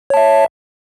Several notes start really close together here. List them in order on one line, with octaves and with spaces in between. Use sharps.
C#5 A5 E5